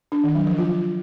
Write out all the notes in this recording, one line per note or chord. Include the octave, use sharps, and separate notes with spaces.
D4
D#3
F#3
F3
F4